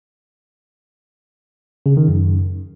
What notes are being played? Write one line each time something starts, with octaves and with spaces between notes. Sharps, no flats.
C#3
D#3
F#2